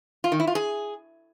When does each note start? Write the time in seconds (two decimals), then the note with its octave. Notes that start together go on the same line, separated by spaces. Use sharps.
0.24 F4
0.32 D#3
0.40 E4
0.47 F4
0.55 G#4